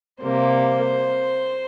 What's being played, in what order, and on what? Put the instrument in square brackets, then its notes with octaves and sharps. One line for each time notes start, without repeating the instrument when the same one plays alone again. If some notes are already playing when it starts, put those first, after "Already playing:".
[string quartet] C3 G3 A#3 C5